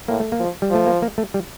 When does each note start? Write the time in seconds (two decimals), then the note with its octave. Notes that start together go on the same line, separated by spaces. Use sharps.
0.08 A2 A#3
0.20 A3
0.32 A#3
0.39 F3
0.62 G3
0.70 F3 A3
0.87 A#3
1.02 A#3
1.18 A3
1.34 G3